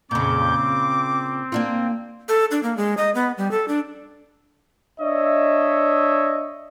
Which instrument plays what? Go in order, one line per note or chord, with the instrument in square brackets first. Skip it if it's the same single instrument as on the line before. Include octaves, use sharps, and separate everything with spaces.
[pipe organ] F2 G6 [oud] A#2 C#3 [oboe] D6
[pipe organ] C4
[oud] A#3 D4 F4
[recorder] A4
D4
A#3
G#3
D#5
B3
G3
A4
D4
[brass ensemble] D4 C#5 D#5 E5